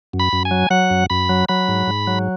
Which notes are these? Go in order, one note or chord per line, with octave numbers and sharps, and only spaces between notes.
F#2
B5
F#2
G#5
F#3
F#3 F#5
F#2
F#2 B5
F#3
F#3 B5
G#2
G#2
F#3